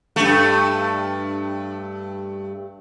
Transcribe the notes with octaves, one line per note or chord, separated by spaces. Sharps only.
G2 A3